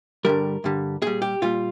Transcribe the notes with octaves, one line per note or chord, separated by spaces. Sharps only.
G2 D3 G3 A#4
G2 D3 G3
A#2 G3 G#4
G4
A#2 G3 F4